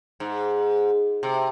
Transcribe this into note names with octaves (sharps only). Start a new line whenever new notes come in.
G#2
C3